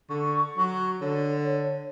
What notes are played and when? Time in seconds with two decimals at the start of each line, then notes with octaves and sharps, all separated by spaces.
0.09 D3 C#6
0.57 F#3
1.01 D3 C#5